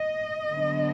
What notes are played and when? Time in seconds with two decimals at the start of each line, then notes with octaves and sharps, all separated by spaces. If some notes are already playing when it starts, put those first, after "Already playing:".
Already playing: D#5
0.50 D3 F#3 B3 D4